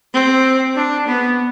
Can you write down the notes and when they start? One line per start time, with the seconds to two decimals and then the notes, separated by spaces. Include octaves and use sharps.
0.14 C4
0.76 D4
1.07 B3